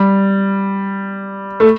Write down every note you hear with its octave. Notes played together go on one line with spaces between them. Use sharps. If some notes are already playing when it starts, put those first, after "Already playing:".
Already playing: G3
A3